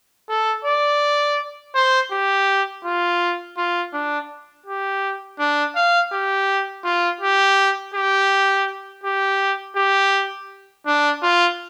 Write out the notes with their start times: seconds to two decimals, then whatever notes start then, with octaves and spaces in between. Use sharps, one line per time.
0.29 A4
0.64 D5
1.75 C5
2.11 G4
2.84 F4
3.57 F4
3.93 D4
4.66 G4
5.39 D4
5.75 F5
6.12 G4
6.84 F4
7.21 G4
7.94 G4
9.04 G4
9.76 G4
10.86 D4
11.22 F4